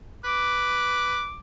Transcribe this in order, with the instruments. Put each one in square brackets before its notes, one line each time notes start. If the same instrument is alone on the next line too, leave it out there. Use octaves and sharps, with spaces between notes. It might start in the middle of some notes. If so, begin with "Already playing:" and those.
[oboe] B4 [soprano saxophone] D6